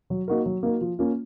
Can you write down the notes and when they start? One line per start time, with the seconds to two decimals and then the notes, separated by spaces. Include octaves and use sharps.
0.10 F#3
0.28 A#3 D#4 F#4 A#4
0.46 F#3
0.63 A#3 D#4 F#4 A#4
0.81 F3
0.99 A#3 C#4 F4